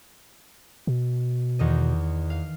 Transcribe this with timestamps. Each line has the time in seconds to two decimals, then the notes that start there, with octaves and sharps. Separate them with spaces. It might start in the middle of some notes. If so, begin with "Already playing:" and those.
0.87 B2
1.59 E2 D#3 D#5
2.30 F5